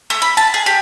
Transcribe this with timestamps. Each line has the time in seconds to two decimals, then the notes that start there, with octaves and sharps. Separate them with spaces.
0.10 A3
0.22 B5
0.37 A5
0.54 G#4
0.66 G4